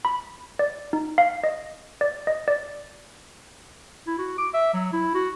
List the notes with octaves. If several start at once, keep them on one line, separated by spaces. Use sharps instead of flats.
B5
D5
D#4
F5
D#5
D5
D#5
D5
E4
F#4
D6
E5
F#3
E4
F#4